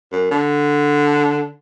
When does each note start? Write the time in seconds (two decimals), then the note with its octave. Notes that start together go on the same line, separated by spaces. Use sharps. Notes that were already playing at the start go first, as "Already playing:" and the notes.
0.12 F#2
0.31 D3